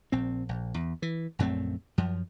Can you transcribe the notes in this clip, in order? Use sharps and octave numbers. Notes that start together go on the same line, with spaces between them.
A#1 C4
A#1
E2
E3
A#1 F#2 A3 C4
F#2 F3